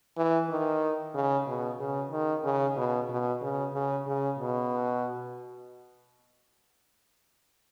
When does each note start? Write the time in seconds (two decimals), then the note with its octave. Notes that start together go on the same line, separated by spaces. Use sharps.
0.17 E3
0.50 D#3
1.14 C#3
1.47 B2
1.80 C#3
2.11 D#3
2.44 C#3
2.76 B2
3.09 B2
3.41 C#3
3.74 C#3
4.07 C#3
4.39 B2